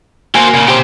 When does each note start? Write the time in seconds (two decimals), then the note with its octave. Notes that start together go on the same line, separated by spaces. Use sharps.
0.35 A#3 F#4 C5 G#5 C6
0.54 A#2 C#3
0.68 G4 C5